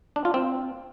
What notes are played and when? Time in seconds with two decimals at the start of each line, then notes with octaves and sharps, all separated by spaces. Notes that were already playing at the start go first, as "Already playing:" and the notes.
0.16 D4
0.25 F4
0.34 C4